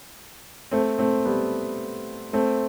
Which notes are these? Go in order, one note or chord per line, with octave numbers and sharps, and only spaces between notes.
A3 C4
A3 C4
G3 B3
A3 C4